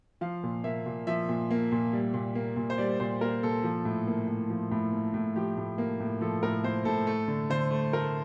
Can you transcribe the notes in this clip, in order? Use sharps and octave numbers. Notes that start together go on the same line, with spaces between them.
F3 F5
A#2
A#3 E5
A#2
F3 E5
A#2
A#3
A#2
G3
A#2
A#3
A#2
C5
G3 D5
A#2 C5
A#3 A#4
A#2 A4
F3
A2
A#3
A2
F3
A2
A#3
A2
F3 G4
A2
A#3
A2
F3 A4
A2 A#4
A#3 C5
A2 A4
A3 A4
D3
D3 C5
A3
A3 A#4